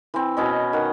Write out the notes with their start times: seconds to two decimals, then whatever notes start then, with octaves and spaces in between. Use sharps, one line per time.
0.14 E3 C4
0.37 B2 C#4 D#5
0.73 D#3 F#5